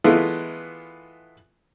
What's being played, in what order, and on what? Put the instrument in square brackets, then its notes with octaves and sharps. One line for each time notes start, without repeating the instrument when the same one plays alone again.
[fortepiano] E3 G#3 A3 B3 F4